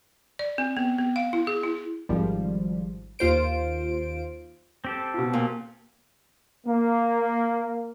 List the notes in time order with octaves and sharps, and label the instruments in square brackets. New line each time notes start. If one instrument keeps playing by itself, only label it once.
[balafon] D5
C4
B3
B3
F5
E4
G#4
E4
[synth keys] G#1 F3 G3
D#2 F4 C5 D7
[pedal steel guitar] C4 G4 A4
[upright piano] B2 F4
[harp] A#2
[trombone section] A#3